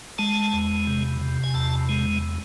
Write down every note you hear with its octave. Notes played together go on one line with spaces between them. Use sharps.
G#3 A5
E2
C3
C3
G#5
E2 A5
G#3